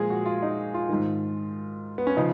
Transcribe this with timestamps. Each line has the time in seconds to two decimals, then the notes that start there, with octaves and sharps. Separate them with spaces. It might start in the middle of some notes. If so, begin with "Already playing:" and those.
Already playing: A#2 F3 G#3 F4 G#4
0.10 F#4
0.26 F4
0.43 D#4
0.74 F4
0.89 G#2 D#3
1.98 B3
2.07 C#4
2.17 C#3 F3 D#4